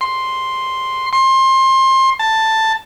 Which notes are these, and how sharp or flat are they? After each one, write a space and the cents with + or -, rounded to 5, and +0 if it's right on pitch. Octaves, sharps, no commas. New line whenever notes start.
C6 +5
C6 +25
A5 +10